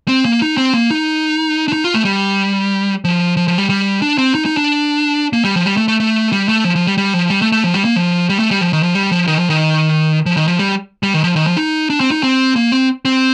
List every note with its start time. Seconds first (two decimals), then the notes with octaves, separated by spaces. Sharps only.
0.08 C4
0.25 A#3
0.42 D#4
0.57 C4
0.74 A#3
0.91 D#4
1.68 D4
1.73 D#4
1.84 F4
1.94 A3
2.05 G3
3.05 F3
3.37 F3
3.48 F3
3.58 G3
3.70 G3
4.02 D4
4.18 C4
4.35 D#4
4.46 D#4
4.57 D4
5.33 A#3
5.44 G3
5.56 F3
5.66 G3
5.77 A3
5.88 A3
6.00 A3
6.33 G3
6.49 A3
6.64 F3
6.76 F3
6.87 G3
6.98 G3
7.14 F3
7.30 G3
7.42 A3
7.52 A3
7.64 F3
7.74 G3
7.85 A#3
7.96 F3
8.29 G3
8.39 A3
8.51 G3
8.61 F3
8.73 D#3
8.83 F3
8.95 G3
9.11 F3
9.27 D#3
9.39 F3
9.50 D#3
10.26 F3
10.37 D#3
10.48 F3
10.59 G3
11.03 G3
11.14 D#3
11.24 F3
11.36 D#3
11.47 F3
11.57 D#4
11.90 D4
12.00 C4
12.11 D#4
12.23 C4
12.56 A#3
12.72 C4
13.05 C4